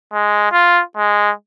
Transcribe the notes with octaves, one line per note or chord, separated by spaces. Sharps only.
G#3
F4
G#3